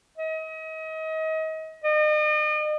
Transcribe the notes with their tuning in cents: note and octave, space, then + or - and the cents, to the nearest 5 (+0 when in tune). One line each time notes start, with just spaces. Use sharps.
D#5 +35
D#5 -40